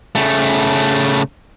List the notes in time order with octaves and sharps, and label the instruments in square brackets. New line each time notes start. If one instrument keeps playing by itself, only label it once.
[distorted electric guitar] C#3 A3